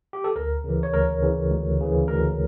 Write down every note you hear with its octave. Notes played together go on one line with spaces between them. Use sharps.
G4
A4
D2 A#4
C#3 E3
C#5
D2 A#4
C#3 E3
D2
C#3 E3
D2 A#4